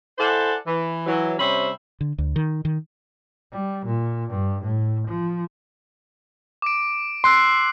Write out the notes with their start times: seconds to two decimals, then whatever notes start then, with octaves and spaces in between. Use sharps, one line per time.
0.18 E4 A4 C5 D5 F#5 G#5
0.66 E3
1.06 E3 F#3
1.39 C3 G3 C#4 C5 E5 B5
2.01 D3
2.18 D2
2.36 D#3
2.65 D#3
3.52 G3
3.86 A#2
4.30 G2
4.63 A2
5.08 F3
6.62 D6 D7
7.24 C6 E6 F#6 C7